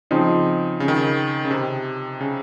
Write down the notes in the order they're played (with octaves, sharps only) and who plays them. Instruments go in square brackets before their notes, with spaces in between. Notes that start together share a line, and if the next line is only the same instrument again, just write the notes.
[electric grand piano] C#3 [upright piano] F3 C4 D#4
[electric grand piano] C#3
D#3
C#3
C#3
C3
C#3